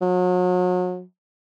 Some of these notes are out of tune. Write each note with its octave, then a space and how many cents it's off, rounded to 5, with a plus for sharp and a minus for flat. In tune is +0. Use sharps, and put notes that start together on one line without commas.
F#3 -35